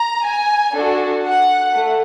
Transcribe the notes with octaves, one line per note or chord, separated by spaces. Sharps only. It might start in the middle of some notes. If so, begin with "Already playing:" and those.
Already playing: A#5
G#5
D4 F#4 A4
F#5
A3